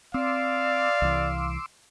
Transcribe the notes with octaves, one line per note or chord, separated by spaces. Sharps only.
C4 D5 F5 C6 D6 E6
C2 E3